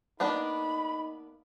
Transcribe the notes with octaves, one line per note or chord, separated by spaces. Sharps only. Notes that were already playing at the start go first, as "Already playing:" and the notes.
A#3 B3 D4 D#4 B5